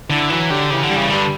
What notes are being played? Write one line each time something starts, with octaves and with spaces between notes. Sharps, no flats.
D3 E4
E3 F#3
D3 G4
C#3 E3
D3
G3
C#3
G2 D3